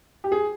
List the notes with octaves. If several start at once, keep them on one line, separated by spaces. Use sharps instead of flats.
G4
G#4